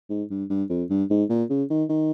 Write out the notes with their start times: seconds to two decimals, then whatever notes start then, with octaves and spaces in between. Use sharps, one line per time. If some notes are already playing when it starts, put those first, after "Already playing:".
0.10 G#2
0.30 G2
0.49 G2
0.70 F2
0.90 G2
1.10 G#2
1.30 A#2
1.50 C#3
1.70 D#3
1.89 D#3